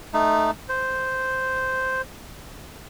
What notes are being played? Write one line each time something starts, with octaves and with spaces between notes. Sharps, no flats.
A3 D#4
C5